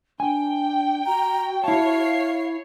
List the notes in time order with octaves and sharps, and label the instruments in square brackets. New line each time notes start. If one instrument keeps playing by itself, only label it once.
[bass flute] D4 [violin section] G5 [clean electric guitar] G#5
[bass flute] F#4 [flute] A#5
[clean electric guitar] E4 A5 [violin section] C#5 C7 [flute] F5